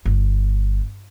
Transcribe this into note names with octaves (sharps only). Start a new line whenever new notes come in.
G1